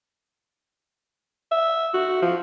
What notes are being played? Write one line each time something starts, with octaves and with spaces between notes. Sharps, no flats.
E5
F#4
F3